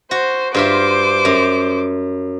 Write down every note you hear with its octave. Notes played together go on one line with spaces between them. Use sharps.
F#4 C5
G2 F4 C5 E5 D6
F#2